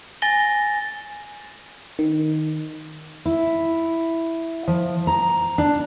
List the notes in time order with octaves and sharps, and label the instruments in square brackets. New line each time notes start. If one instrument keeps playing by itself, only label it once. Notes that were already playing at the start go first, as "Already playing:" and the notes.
[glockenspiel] G#5 A6 A#6 G7
[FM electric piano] D#3
[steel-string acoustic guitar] E4
F3
A#5
D4